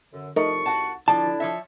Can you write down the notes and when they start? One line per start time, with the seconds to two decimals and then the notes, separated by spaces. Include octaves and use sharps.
0.13 F#2 D3
0.36 C2 F3 A3 D#4 A#4 C#6
0.66 F#4 F#5 A5
1.08 D3 F3 D4 E4 D5 A5
1.40 F3 C#5 E5